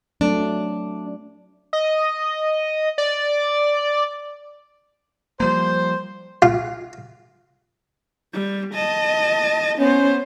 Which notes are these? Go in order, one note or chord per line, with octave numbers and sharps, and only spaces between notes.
F#3 A3 C4 D4
D#5
D5
F3 G3 A#3 C5
F4
G3
D#5 A5
B3 C#4 C5